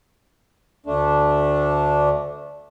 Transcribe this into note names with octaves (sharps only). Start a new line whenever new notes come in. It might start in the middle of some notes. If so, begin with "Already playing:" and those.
D2 A3 D4